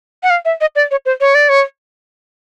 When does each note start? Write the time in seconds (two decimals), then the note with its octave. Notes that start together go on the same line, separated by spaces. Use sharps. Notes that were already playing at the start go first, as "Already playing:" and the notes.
0.23 F#5
0.30 F5
0.45 E5
0.61 D#5
0.76 D5
0.91 C#5
1.06 C5
1.21 C#5
1.35 D5
1.49 C#5